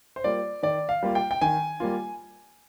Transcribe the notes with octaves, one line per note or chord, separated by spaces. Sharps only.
C5
G3 A#3 F4 D5
D#3 D5
F5
G3 A#3 F4
G5
G5
D#3 G#5
G3 A#3 F4